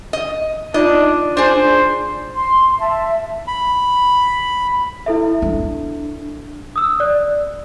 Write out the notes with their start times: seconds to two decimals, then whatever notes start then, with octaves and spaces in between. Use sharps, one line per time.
0.13 D#5
0.74 D4 D#4 F4 D5 D#5
1.37 D4 G#4 C5
2.35 C6
2.79 E5 A5
3.47 B5
5.06 E4 A4 E5
5.42 D4
6.76 D#6 E6
7.00 D5 F#6